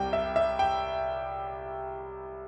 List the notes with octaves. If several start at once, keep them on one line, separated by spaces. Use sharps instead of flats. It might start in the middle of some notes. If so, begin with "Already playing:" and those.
Already playing: C2 C3 G3 G5
E5
E5
G5